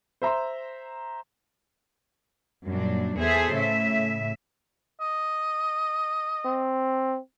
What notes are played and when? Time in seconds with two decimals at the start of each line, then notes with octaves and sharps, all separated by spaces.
0.22 C5 E5 A#5 C6
2.67 F#2 A#2 G3 D4
3.19 E2 G#4 A4 C5 E5
3.55 A2 C#3 E5
5.00 D#5
6.45 C4